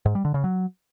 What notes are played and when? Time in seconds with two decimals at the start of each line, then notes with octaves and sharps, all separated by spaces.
0.06 G#2
0.15 G3
0.25 D3
0.34 C#3
0.44 F#3